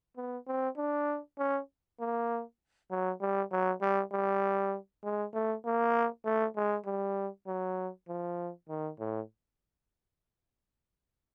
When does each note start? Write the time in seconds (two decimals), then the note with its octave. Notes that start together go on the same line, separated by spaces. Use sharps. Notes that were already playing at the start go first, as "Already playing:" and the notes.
0.17 B3
0.47 C4
0.77 D4
1.39 C#4
2.00 A#3
2.91 F#3
3.21 G3
3.52 F#3
3.81 G3
4.12 G3
5.04 G#3
5.34 A3
5.65 A#3
6.25 A3
6.56 G#3
6.86 G3
7.47 F#3
8.08 F3
8.69 D#3
8.99 A2